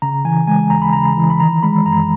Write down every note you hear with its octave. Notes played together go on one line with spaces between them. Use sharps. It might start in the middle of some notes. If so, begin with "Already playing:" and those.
C#3 A#5
E3 G#5
G#3 G#5
D#2 A#5
B5
C#3 A#5
E3
B5
D#3 A#5
G#3 B5
F#2 A#5